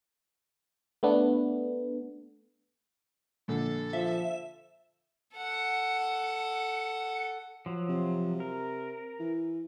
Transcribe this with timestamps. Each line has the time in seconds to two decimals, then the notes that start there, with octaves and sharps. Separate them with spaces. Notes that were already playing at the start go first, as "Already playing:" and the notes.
1.03 A3 B3 D4
3.48 A#1 D3 A4
3.93 F3 E5
5.37 A4 F#5
7.66 F3 F#3
7.89 C3
8.40 A#4
9.20 E3